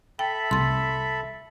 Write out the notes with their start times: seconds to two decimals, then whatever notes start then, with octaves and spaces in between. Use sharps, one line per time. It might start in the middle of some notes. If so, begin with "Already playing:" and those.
0.19 A4 E5 G5 B5
0.51 C2 A3 C6 A6